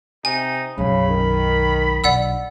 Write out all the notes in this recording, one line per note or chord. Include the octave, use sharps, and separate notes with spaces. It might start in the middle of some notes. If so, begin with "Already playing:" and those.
C3 D#4 G#5
B1 F#2 C#3 B5
D#3
B1 D4 D5 F#5 E6